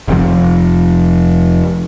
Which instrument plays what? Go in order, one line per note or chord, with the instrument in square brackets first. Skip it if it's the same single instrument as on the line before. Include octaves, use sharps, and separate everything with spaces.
[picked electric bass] F1 C3 F3